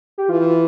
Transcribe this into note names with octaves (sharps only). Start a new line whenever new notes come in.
G4
E3 F4